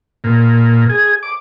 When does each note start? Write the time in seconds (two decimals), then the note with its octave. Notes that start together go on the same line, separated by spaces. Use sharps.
0.24 A#2
0.89 G#4
1.23 D6